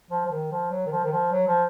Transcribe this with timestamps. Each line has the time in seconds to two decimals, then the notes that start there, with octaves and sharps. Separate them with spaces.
0.10 F3
0.26 F3
0.31 D#3
0.52 F3
0.71 F#3
0.86 D#3
0.92 F3
1.04 D#3
1.12 F3
1.32 F#3
1.47 F3